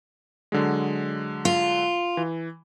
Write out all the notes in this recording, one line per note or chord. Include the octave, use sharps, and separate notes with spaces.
D3 F#3 G#3
F4
E3